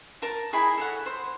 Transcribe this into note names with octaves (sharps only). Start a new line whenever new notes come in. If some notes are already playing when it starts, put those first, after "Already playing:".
A#4 A5 A#5
E4 G#4 D#5 B5
A4 C#5 F#5
C5